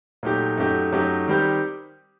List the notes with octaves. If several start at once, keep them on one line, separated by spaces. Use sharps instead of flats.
A#2 F#3 A3 D#4 G4
F#2 F#3 A3 D#4 G4
F#2 F#3 A3 D#4 G4
D#3 G3 C4 G4